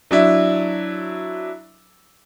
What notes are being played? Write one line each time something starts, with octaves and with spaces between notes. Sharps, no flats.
F#3 D4 E4